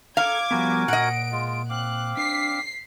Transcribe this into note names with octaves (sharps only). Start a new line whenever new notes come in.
A4 F5 A#5 D6 G#6
F3 G3 B3 F#4 A#4 G#5
A#2 D#5 F#5 D7
G#3 F4
C4 F5 D6 F#6
D4 B6 C7